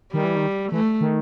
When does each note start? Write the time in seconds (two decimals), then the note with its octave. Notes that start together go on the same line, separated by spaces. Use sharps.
0.13 D#3 G3
0.25 E3
0.36 D#3
0.72 E3 A3
1.01 D#3